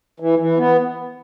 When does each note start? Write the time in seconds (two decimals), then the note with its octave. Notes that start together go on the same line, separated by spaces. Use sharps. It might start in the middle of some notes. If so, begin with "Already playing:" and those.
0.20 E3
0.39 E3
0.58 B3